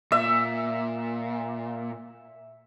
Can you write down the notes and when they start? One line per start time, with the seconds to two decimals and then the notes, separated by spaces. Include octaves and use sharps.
0.12 A#2 E5